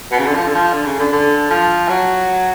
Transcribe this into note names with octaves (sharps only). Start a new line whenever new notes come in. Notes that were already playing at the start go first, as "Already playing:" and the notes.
B2
C#3
D3
F3
D3
F3
D3
C#3
D3
D3
F3
F#3